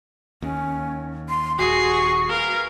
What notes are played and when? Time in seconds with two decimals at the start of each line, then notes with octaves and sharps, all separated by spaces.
0.42 D#2 C#4
1.29 C6
1.58 D#1 F#4 G#4 C#6 C7
2.29 G#4 A#4 B4 F5